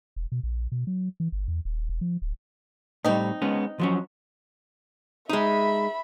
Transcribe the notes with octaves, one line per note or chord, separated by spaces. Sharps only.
E1
B2
A#1
B2
F#3
E3
G1
E2
D#1
E1
F3
D1
A2 G3 C4 D#4
G#3 B3 C#4
F3 F#3 C#4
G#3 D#4 E5 B5